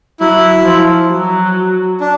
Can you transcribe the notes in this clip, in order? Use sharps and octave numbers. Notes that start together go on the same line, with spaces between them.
F#3 E4
F3
F#3
D4